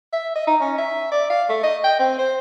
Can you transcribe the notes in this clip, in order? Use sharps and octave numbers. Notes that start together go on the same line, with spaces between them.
E5
D#5
D#4
C#4
E5
D5
F5
A3
D#5
G5
C4
C5